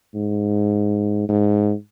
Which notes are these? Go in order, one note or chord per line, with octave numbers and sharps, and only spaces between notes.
G#2
G#2